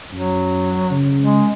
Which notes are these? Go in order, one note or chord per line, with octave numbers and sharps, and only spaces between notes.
F#2 F#3
C#3
G#3